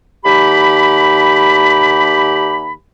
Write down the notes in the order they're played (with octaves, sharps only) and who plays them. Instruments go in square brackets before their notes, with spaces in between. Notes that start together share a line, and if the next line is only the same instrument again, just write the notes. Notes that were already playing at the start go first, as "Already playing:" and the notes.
[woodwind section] D#2 G4 B5